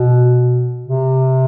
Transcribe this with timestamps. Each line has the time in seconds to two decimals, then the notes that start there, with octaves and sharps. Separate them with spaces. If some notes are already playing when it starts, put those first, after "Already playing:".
Already playing: B2
0.88 C3